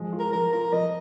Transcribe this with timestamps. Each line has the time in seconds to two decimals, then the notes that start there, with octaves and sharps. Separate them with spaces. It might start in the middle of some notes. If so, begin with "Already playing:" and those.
Already playing: F3 G#3
0.13 F4
0.19 A#4
0.33 F3 A#4
0.53 F4 A#4
0.72 F3 D#5